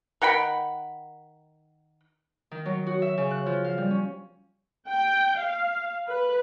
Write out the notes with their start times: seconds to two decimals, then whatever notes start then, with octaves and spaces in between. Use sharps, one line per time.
0.22 D#3 F#5 G5 B5
2.51 D#3
2.65 F#3
2.87 F#4
3.02 E5
3.18 C#3
3.31 F#6
3.46 F3
3.65 F5
3.78 G3
3.91 C#4
4.89 G5
5.38 F5
6.08 B4